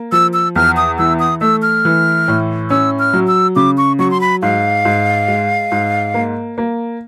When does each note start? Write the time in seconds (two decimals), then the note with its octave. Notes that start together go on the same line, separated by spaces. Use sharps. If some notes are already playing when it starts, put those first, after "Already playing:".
Already playing: A#3
0.12 F3 E6
0.33 E6
0.56 E2 F6
0.77 D#6
0.98 E3 E6
1.20 D#6
1.41 A3 E6
1.62 F6
1.85 E3
2.28 A2
2.70 C#4 E6
2.99 F6
3.14 F#3
3.27 E6
3.56 C#3 D6
3.78 C#6
3.99 F#3 C#6
4.11 C6
4.21 B5
4.42 G#2 F5
4.85 G#2
5.28 G#3
5.72 G#2
6.14 A#3
6.58 A#3